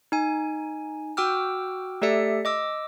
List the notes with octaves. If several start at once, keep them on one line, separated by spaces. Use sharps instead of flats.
D#4 G#5
F#4 G5 D6 E6 F6
A3 G4 A4 D5 E5 C#7
D#5 D6 E6